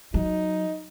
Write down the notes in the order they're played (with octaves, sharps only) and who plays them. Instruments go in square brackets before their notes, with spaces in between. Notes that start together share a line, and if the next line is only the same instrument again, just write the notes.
[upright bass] F#3 [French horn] D#4